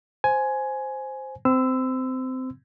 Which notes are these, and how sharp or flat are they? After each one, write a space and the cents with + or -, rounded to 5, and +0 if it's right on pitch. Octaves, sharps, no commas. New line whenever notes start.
C5 +0 G#5 +10
C4 -20 C6 -40 E6 +0